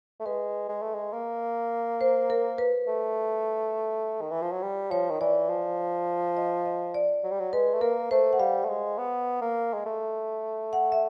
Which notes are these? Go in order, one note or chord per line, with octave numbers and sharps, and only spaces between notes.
A3
G#3 B4
G#3
A3
G#3
A#3
C5
A#4
B4
A3
D#3
E3
F3
F#3
G3
F3 C#5
D#3
E3 D5
F3
D#5
D#5
D5
F#3
G3
F#3
G#3 B4
A3
A#3 A#4
A3 C5
F#5
G3 F5
A3
G#3
B3
A#3
G#3
A3
F#5
E5